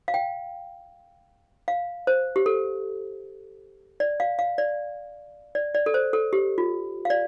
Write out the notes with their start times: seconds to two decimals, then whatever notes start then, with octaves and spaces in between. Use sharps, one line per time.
0.08 F5
0.14 G5
1.68 F5
2.07 C5
2.36 G4
2.46 A4
4.00 D5
4.20 F5
4.39 F5
4.58 D5
5.55 D5
5.75 D5
5.86 A4
5.94 C5
6.13 A4
6.33 G4
6.58 F4
7.05 F5
7.10 D5